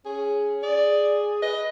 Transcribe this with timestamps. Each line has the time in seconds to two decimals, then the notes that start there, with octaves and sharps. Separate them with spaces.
0.05 C#4 G#4
0.63 G#4 D5
1.42 B4 D#5